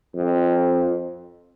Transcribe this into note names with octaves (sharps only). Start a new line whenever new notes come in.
F2